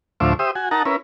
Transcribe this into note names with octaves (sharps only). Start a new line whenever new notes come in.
D2 A2 F3 C5 E5 D6
G4 C5 E5 D#6
F#4 G#5
D#4 A#4 F#5 A5 A#5
C#4 E4 A#4 B4